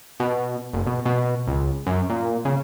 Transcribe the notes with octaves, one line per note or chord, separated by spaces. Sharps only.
B2
F#1
B2
B2
C#2
F#2
A#2
C#3